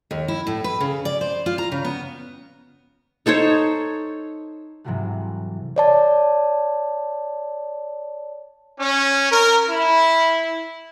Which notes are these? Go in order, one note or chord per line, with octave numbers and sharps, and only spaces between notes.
D#2
E4
A2
B4
C#3
D5
C5
F4
A#5
C#3
B3
D#4 A4 C5 C#5
G#2 C3 E3 F#3 G3 A3
C#5 D5 A5
C#4
A#4
E4